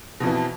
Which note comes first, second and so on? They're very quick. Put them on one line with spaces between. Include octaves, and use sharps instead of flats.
B2 F2 E3